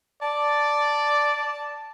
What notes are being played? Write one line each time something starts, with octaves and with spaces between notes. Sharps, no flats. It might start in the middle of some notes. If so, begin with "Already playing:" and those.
D5 A5